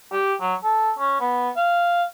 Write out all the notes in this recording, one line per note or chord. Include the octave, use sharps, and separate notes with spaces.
G4
F#3
A4
C#4
B3
F5